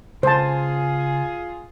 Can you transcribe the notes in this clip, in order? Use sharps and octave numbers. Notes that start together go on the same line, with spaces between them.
C#2 F4 G#4 C5 G#5 A5